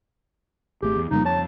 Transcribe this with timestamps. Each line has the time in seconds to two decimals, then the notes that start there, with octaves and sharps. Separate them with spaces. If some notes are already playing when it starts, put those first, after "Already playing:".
0.83 G#1 A3 G4 G#4
0.96 E2
1.11 F2 C#3 G3 A#3 D#4
1.25 C#5 A5